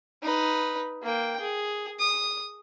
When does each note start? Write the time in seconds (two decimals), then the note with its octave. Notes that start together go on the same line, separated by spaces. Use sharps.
0.22 D#4 B4
1.02 A#3 G5
1.40 G#4
1.99 D#6